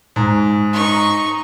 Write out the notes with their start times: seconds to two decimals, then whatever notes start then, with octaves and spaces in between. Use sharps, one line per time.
0.16 G#2
0.73 D#4 C#6